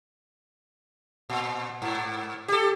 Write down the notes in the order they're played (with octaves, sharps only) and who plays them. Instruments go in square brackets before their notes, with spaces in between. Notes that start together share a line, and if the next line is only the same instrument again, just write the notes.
[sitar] A#2
G#2
G4 A4